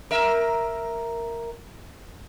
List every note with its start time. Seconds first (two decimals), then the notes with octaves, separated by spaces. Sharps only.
0.11 A#4 E5